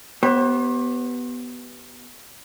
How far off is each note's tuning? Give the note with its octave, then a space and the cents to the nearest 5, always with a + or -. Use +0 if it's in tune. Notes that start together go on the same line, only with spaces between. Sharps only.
B3 +0 G4 -25 C5 +40